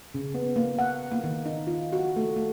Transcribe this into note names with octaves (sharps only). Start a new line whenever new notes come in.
C#3
B3
A#3
F#5
A#3
D#3
D#4
F4
F#4
A3
A3